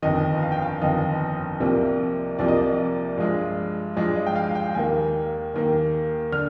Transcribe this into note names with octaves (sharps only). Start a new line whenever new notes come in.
G1 F2 D#3 D#5
F5
G5
F5
G1 F2 D#3 D#5
C2 C3 F3 A#3
C2 C3 F3 A#3 D5
D#5
D5
G2 F3 G#3
G2 F3 G#3 D5
D#5
G5
F5
F5
G5
D#2 D#3 A#3 G#5
D#2 D#3 A#3
D3 F6